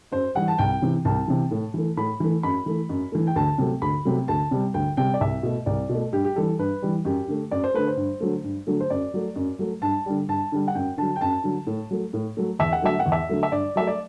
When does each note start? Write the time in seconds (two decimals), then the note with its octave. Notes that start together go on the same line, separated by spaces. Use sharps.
0.12 F#2 C5
0.35 E3 G3 F#5
0.48 A5
0.58 C2 G5
0.82 C3 E3
1.05 C2 A5
1.28 C3 E3
1.51 A2
1.74 E3 A3
1.97 A2 B5
2.20 E3 A3
2.43 F#2 B5
2.66 E3 A3
2.89 F#2
3.12 E3 A3
3.27 G5
3.36 D2 A5
3.58 C3 F#3 A3
3.82 D2 B5
4.05 C3 F#3 A3
4.28 D2 A5
4.51 C3 G3
4.74 D2 G5
4.97 C3 G3 G5
5.14 D5
5.21 C2 E5
5.43 B2 A3
5.66 C2 D5
5.89 B2
5.94 A3
6.13 G2 G4
6.25 G4
6.36 E3 G3 A4
6.59 G2 B4
6.82 E3 G3
7.05 F#2 G4
7.28 D3 A3
7.51 F#2 D5
7.64 C5
7.74 D3 A3 B4
7.87 C5
7.97 G2
8.20 D3 F#3 A3
8.44 G2
8.67 D3 F#3 A3
8.80 C5
8.90 F#2 D5
9.14 F#3 A3
9.36 F#2
9.59 F#3 A3
9.82 G2 A5
10.06 D3 G3
10.29 G2 A5
10.52 D3 G3
10.68 F#5
10.75 F#2 G5
10.97 D3 F#3 A5
11.16 G5
11.21 F#2 A5
11.44 D3 F#3
11.67 A2
11.91 F#3 A3
12.13 A2
12.37 F#3 A3
12.59 E2 E5
12.72 F#5
12.82 D3 F#3 A3 E5
12.99 F#5
13.06 E2
13.12 E5
13.29 D3 F#3 A3
13.43 E5
13.52 G2 D5
13.76 F#3 A3 E5
13.87 D5